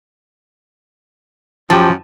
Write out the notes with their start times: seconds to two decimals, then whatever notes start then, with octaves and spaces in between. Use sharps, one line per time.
1.70 F#2 F3 G4 A5